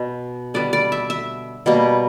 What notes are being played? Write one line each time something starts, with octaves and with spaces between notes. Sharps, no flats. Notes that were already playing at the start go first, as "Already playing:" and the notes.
Already playing: B2 B3
D3 G3 B3 D5
D5
E5
E5
B2 G3 A#3